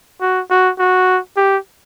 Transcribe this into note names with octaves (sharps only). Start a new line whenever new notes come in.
F#4
F#4
F#4
G4